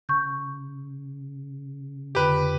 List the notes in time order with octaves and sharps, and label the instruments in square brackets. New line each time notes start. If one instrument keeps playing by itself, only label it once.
[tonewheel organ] C#3 [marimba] C#6 G6
[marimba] F2 D3 [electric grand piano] G4 B4